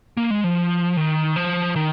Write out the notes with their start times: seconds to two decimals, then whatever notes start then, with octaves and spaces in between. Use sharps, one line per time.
0.17 A#3
0.31 G#3
0.44 F3
0.97 D#3
1.36 F3
1.76 D#3